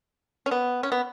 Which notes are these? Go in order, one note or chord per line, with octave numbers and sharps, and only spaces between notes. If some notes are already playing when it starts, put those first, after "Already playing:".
C#4
B3
C#4
B3